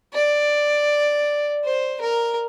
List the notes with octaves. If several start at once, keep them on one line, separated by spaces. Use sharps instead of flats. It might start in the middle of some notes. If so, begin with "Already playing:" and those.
D5
C5
A#4